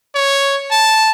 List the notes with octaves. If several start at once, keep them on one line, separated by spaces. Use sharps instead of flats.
C#5
A5